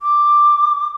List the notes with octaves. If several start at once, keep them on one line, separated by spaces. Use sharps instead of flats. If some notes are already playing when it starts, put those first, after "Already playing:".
D6